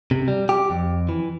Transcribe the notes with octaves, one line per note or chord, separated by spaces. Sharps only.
C3
G3
G4
F2
E3